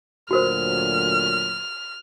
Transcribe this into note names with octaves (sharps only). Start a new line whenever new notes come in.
D2 A#2 F#3 F#4 A#4 C5 F6